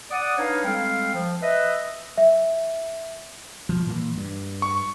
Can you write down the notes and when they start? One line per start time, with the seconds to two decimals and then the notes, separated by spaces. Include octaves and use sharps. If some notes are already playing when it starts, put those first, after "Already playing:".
0.11 D5 F#5 D#6
0.38 D4 D#4 B4 C#5 F5
0.65 G3 G#3 C4 A4 F5 G5
1.14 F3
1.42 B4 D#5 E5
2.17 E5
3.69 B2 F3
3.87 A#2 E3 A#3
4.15 G2
4.62 C#6